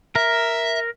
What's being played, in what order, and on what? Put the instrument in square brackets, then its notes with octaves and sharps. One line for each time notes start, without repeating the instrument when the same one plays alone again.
[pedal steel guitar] A#4 [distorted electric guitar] E5